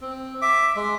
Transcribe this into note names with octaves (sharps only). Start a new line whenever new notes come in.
C4
E5 D6
G#3